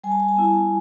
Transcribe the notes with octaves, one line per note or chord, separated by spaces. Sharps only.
G3 G#5
A5
G#5
A5
B3 E4 G#5
A5
G#5